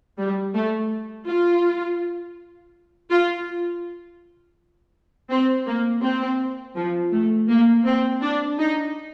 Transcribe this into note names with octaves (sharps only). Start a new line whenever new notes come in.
G3
A3
F4
F4
C4
A#3
C4
F3
A3
A#3
C4
D4
D#4